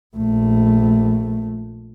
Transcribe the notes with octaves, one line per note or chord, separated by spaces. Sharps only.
A#1 A3